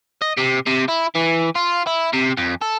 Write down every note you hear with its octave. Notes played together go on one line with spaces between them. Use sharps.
D#5
C3
C3
E4
E3
F4
E4
C3
F2
A4